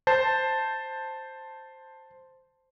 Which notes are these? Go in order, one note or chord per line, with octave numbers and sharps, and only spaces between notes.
C5 A5